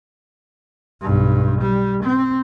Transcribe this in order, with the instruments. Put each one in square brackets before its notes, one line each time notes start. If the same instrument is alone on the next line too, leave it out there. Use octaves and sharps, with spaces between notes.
[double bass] B1 G2
G3
C4